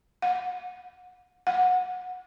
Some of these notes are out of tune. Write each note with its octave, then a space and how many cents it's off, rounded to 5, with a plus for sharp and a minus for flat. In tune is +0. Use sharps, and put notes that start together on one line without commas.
F#5 -30
F#5 -20